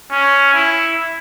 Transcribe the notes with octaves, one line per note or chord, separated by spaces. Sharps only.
C#4
E4